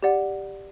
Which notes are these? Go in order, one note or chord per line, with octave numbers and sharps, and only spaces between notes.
G4 D5 F#5